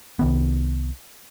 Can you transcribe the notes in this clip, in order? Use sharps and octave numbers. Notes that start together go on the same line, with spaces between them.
C2 D#3 B3